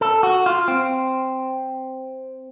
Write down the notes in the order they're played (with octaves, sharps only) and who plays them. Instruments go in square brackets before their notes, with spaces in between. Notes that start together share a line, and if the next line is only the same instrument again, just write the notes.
[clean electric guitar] A4
F#4
F4
C4